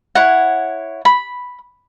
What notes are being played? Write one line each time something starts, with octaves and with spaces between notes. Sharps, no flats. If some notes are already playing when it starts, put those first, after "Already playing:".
E4 C#5 F#5
B5